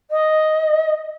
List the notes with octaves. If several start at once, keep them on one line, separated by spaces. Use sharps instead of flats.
D#5